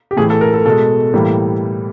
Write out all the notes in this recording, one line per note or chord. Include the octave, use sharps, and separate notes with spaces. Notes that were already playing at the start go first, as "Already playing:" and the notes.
G4
A2 E3 A3 G#4
A4
A#4
A4
B2 G#3 A4
A2 E3 G3 A#3